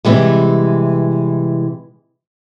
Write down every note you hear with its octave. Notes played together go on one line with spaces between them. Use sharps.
C3 E3 G3 G#3